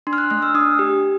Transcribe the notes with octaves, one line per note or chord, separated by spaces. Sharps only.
D4 C6
F6
F#6
A3 F6
E6
D4 D#6
G4